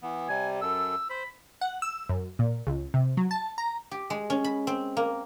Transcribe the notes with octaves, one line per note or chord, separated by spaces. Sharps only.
E3 B3
C3 G3 G#5
F#2 A4 E6
C5 B5
F#5
E6
F#2
A#2
C#2
C3
F#3
A5
A#5
G4
G#3
C#4
B5
C4
A#3